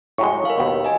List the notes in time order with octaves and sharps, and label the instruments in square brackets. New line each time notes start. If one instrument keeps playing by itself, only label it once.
[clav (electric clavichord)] A2 F#3 G#3 [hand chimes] C#6
[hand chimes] A#4 F5
[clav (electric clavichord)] D#2 B2 D#3
[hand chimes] D#5 G#5